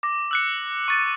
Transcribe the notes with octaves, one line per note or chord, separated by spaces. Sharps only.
D6 A#6
E6 F#6 C#7
C#6 A6 D#7